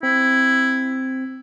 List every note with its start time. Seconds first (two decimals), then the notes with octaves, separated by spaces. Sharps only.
0.03 C4 E4